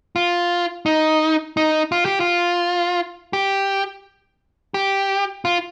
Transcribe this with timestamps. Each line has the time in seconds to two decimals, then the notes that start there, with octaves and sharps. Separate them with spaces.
0.16 F4
0.86 D#4
1.57 D#4
1.92 F4
2.05 G4
2.20 F4
3.33 G4
4.74 G4
5.45 F4